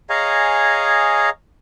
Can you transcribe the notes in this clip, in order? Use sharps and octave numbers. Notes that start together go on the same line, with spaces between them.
G#4 C#5 D#5 F5 G#5 A#5